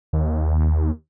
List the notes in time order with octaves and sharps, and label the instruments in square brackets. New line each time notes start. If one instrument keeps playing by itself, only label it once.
[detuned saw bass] D#2